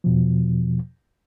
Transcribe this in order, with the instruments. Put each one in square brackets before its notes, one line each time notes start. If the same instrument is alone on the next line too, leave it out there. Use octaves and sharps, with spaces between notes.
[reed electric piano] E2 B2 F3